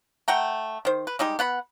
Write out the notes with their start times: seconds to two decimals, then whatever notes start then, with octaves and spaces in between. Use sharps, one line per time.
0.28 A3 F#5 G5 A#5
0.85 D#3 C5
1.07 B4
1.19 G3 G#3 D#4 G4
1.39 B3 F#5 B5